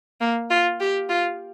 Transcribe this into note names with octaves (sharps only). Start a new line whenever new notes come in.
A#3
F4
G4
F4